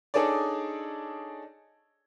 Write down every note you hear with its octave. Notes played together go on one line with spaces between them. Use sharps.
D4 D#4 G#4 A4 C#5 D5